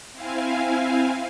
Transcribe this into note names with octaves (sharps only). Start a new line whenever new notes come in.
C4 E4 F5 G#5